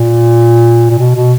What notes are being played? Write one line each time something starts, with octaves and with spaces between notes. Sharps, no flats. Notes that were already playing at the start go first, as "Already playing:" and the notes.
Already playing: A#2
A#2
B2
B2